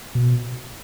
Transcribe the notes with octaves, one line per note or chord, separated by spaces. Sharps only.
B2